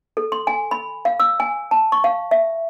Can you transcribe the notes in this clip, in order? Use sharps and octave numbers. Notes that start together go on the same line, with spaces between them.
A4
C6
G#5
B5
F5
E6
G#5
A5
C#6
F5
E5